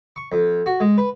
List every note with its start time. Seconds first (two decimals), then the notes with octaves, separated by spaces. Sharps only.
0.16 C#6
0.32 F2
0.66 F#4
0.80 G#3
0.98 B4